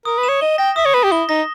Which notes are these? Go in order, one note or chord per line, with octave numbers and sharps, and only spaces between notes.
A#4 D#6
B4
E7
C#5
D#5 G7
G5 A#6
E5 D#6
C#5
B4 E7
G4
E4 G7
D#4 A#6